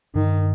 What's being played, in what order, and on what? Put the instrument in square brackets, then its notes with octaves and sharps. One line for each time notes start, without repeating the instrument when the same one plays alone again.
[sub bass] G2 [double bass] D#3